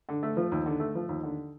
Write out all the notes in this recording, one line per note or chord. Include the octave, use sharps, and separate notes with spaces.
D3
A3
F3
D#2
D3
A3
F3
D#2
D3